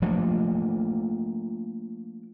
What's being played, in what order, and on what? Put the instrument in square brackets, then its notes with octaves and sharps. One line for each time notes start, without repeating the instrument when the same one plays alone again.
[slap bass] F3 A3 A#3 D4